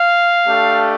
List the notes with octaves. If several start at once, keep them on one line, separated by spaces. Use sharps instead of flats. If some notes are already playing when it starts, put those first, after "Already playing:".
Already playing: F5
A3 D4 G4